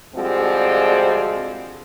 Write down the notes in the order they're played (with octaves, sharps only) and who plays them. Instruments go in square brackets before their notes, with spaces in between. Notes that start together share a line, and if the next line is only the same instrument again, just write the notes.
[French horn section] D3 F3 G3 G#3 C4 F#4